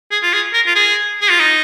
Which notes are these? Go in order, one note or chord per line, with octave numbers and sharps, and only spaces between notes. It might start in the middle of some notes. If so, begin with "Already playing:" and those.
G#4
F4
G#4
A#4
F4
G#4
G#4
F4
D#4